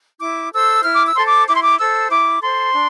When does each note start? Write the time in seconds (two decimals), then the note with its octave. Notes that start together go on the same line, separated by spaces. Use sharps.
0.20 E4 D6
0.51 A4 C5 E6
0.83 E4 F6
0.95 D6
1.05 E6
1.15 A4 C5 C6
1.25 D6
1.47 E4 D6
1.55 C6
1.61 D6
1.78 A4 C5 E6
2.10 E4 D6
2.42 A4 C5 C6
2.73 D4